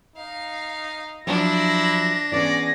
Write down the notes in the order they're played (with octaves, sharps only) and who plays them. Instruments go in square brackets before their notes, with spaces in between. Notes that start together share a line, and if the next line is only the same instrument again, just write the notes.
[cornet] D#4 [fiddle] F5
[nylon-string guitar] F3 F#3 [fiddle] D4 [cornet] E4 [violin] A#6
[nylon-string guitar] E3 B3 C#4 [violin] G#4 A#6 [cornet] D5